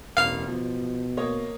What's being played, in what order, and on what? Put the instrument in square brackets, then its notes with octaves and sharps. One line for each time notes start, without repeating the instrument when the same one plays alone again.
[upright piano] E1 [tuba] A1 [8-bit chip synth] F5 F6
[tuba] B2 [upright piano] F3
[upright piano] A#3 C#5 D#5